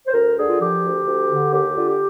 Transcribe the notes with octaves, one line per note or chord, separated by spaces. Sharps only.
C5
D2 A#4
D3 G#4
F4
F3 G4
D2
D2
D3
D#2 G4
D3 F4
G4